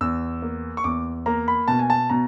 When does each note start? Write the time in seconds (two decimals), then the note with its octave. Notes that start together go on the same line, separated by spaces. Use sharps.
0.01 E2 E6
0.42 A#3
0.77 C#6
0.84 E2 D6
1.26 A#3 A#5
1.48 B5
1.68 B2 A5
1.79 G#5
1.90 A5
2.10 B2 A#5